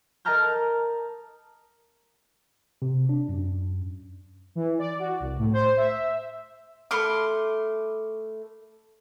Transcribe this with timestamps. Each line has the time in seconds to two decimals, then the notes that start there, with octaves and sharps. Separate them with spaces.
0.25 A#4 D#5 A5 A#5 F6 G6
2.82 C3
3.09 D4
3.29 F#2
4.55 E3
4.79 D5
4.99 F#4
5.20 C2
5.38 A2
5.53 C5
5.77 E5
6.91 A3 B5 C6 D6 F6